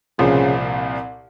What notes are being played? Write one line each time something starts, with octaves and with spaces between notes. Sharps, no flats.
C2 A#2 C#3 F3